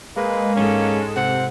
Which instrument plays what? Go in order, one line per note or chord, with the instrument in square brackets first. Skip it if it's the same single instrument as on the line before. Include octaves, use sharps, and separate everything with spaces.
[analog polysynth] G#3 [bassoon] A#3 [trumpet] B4
[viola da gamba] G#2 A4 [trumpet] C#4
[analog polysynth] C3 [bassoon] C4 [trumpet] F#5